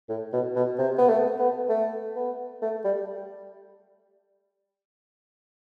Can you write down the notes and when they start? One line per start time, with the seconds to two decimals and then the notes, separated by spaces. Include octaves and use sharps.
0.09 A2
0.33 B2
0.56 B2
0.79 C3
0.98 B3
1.09 A3
1.39 B3
1.69 A3
2.16 B3
2.62 A3
2.84 G3